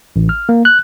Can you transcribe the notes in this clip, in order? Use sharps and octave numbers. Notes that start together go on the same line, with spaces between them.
A1
F6
A#3
F#6